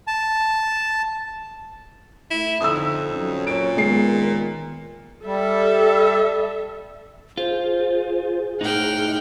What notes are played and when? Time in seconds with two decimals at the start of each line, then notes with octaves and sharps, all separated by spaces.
0.07 A5
2.31 A3 E4
2.60 F2 D3 D#4 D#6 E6
3.13 F#3 C#4
3.47 A#2 C#5 D7
3.77 D#3 G#3 B3 C7
5.25 G3 A4 E5
7.37 F4 G#4 C5
8.61 A2 D#4 F#5 G5 F6